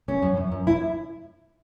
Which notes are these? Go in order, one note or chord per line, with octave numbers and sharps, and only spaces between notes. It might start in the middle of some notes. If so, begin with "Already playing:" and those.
F#2 C#4
F#2
F#2
F#2
E4